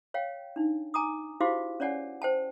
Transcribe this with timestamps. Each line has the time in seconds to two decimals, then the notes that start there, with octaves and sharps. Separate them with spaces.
0.14 C#5 F5 G5
0.56 D4 D#4
0.94 G#5 A#5 D6 D#6
1.41 E4 F#4 G4 C5 F5 D6
1.80 C#4 C#5 D5 F#5 G#5
2.22 C5 G5 A5